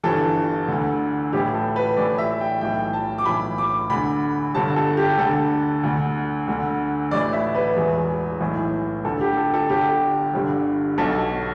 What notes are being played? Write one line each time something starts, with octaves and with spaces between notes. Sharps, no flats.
G1 G2 E3 A4
D2 D3
A1 A2 E3 G4
A4
B4
A1 A2 E3 D5
E5
G5
B1 A2 E3 G5
A5
D6
B1 A2 E3 B5
D6
D2 D3 B5
G1 G2 D3 A5
A4
G4
D2 D3 A4
D2 D3
D2 D3
A1 A2 E3 D5
E5
B4
E1 E2 E3
B1 A2 E3
D2 D3 A4
G4
A4
A4
G1 G2 D3 G4
G1 G2 D3
B1 B2 A4